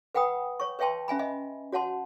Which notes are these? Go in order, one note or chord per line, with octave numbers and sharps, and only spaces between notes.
B4 F#5 G5 B5 D#6
C#5 C#6
B4 C#5 E5 G5 A5 C6
C#4 E5 G#5 B5
D#5 E5 G#5
F#4 C#5 F#5 A5 C6